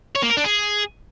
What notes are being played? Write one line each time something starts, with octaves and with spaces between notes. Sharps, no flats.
C#5
A#3
A#4
D4
G#4